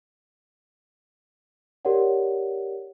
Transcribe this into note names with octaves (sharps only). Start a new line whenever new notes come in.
G4 A#4 C#5 D5 F#5